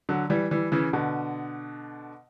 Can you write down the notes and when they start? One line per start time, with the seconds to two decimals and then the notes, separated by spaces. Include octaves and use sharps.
0.09 D3 F#3
0.30 E3 G3
0.51 E3 G3
0.72 C#3 E3
0.93 B2 D3